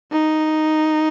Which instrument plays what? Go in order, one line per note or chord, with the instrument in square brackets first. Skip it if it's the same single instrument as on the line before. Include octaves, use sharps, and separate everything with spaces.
[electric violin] D#4